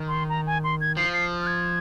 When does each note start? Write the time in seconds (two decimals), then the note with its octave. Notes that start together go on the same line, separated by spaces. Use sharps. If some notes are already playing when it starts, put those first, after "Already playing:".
Already playing: D#3
0.08 C6
0.29 A#5
0.47 G#5
0.64 C6
0.81 G#6
0.97 F3 C7
1.13 C7
1.41 F6
1.47 G#6